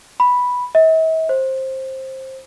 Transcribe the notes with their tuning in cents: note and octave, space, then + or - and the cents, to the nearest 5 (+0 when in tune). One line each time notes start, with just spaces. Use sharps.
B5 -5
E5 -45
C5 +15